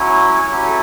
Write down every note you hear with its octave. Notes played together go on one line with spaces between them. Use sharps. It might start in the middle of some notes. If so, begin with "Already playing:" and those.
Already playing: F#3 C#4 E4 C#5
F#3 C#4 E4 G4
A4